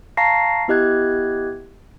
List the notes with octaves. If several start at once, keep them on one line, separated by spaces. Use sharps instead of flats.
F5 A5 A#5 C#6 A#6 C7
B3 E4 G4 D#5 F#6 G#6